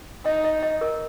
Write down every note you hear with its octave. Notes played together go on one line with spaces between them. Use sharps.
D#4 D#5
D#5
D#5
A#4